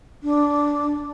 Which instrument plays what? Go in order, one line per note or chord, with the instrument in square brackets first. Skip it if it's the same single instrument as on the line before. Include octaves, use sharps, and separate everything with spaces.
[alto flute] D4